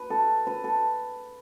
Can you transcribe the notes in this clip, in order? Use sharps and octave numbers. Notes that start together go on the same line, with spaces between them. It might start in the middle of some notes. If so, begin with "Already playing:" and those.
Already playing: B4
A4
B4
A4